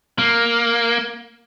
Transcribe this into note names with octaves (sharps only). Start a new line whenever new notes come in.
A#3